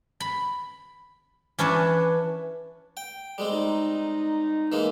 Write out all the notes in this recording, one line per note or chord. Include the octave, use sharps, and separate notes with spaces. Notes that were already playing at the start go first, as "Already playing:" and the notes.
B5
E3 C#4 D4 B4 C#5 A5
G5
G3 G#3 C4
D#4
E3 G#3 A#3